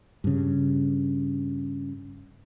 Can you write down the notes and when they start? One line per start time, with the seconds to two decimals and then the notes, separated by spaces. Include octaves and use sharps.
0.24 G2 C#3